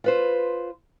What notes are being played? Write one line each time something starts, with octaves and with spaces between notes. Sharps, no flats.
F4 B4 C5